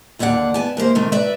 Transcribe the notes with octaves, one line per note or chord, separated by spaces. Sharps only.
D#2 D3 A#3 D5 F#5
B3 G#5 A5
F#2 A#3 B4 C5
C3 D#3 A3 A#4
B4 D5 E5